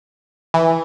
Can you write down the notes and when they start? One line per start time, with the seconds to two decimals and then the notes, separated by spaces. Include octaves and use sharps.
0.54 E3